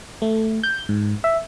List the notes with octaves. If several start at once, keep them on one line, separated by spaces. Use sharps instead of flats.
A3
G6
G#2
E5